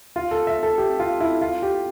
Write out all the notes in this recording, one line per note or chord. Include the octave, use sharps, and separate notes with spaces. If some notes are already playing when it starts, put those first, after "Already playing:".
F4
A4
E5
A4
G4
F4
E4
F4
G4